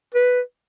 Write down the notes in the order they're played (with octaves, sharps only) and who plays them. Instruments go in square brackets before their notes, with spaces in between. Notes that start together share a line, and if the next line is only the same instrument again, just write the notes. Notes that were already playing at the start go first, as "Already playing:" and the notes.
[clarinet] B4